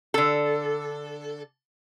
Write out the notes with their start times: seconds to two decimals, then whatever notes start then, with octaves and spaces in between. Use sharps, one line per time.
0.14 D3 A4